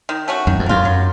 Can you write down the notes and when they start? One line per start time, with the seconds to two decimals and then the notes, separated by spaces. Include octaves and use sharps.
0.09 D#3
0.28 A3 C#4 F#4
0.47 F#2 D#3
0.59 F2
0.66 F#2 A#3 F4
0.85 F#3